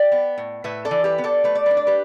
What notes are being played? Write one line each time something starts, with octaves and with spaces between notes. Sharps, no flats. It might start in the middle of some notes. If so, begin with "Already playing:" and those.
Already playing: D5 G5
B3
A2
A2 B4 E5
A4 D5
E3
G4 B4
B3
A4 D5
A3 B4
D5
D4 B4
D5
G4 B4